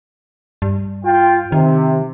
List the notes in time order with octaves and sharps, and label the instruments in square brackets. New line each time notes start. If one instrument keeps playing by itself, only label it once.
[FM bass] G2
[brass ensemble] F4 G5
[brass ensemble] C3 [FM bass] D#3